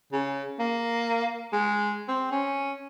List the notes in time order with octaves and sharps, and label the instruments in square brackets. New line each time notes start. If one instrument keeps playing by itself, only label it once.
[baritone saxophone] C#3
A#3
G#3
C4
C#4